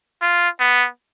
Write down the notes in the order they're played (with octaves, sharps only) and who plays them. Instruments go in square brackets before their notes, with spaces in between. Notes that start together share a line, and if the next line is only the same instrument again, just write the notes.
[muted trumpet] F4
B3